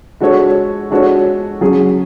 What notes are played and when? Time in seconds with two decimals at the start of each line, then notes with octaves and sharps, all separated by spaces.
0.20 G#3 D4 F#4 A4 C#5
0.90 G#3 D4 F#4 A4 C#5
1.61 F#3 C#4 G#4